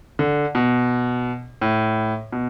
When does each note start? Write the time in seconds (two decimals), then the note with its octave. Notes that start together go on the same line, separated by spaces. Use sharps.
0.19 D3
0.55 B2
1.61 A2
2.32 B2